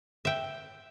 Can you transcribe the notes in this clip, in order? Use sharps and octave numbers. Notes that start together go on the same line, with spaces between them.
E5 G5